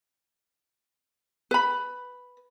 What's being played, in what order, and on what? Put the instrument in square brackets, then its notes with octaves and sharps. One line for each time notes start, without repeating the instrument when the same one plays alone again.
[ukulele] B4 B5